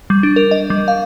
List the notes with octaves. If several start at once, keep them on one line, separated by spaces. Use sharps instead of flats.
G3
D4
A#4
D#5
G3
F5